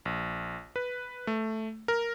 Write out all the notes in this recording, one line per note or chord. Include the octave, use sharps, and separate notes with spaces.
A#1
B4
A3
A#4